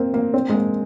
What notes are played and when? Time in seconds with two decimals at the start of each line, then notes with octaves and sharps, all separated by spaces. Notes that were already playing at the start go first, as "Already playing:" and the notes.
Already playing: A#3 C4
0.14 A#3
0.34 C4
0.49 G#3
0.54 A#3